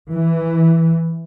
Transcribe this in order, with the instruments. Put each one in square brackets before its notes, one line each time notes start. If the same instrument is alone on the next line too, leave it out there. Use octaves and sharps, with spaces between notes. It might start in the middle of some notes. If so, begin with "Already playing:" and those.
[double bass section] E3